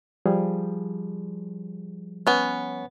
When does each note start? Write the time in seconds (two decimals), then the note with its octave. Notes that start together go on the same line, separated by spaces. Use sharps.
0.26 F3 G3 G#4
2.27 B3 C#4